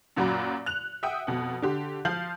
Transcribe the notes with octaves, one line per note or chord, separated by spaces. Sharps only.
F#2 A#2 F#3 F#4 A#5 B5
F#6 F7
E5 F#5 G5 D#6
F2 B2 F#5
D3 G4 C6
F3 F5 G6 F#7